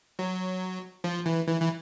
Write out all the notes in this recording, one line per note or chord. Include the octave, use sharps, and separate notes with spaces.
F#3
F3
E3
E3
E3